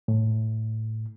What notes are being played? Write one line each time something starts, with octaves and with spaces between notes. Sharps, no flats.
A2